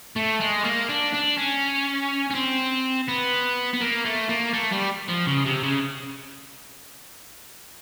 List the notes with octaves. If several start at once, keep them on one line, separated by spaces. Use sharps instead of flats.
A3
G#3
A#3
D4
D4
C#4
C#4
C4
B3
B3
A#3
A3
A#3
A3
G3
F3
C#3
C3
C#3